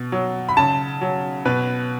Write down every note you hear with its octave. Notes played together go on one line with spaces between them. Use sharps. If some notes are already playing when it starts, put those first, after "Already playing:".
Already playing: B2
F#3
B5
C#3 A5
F#3
B2 B4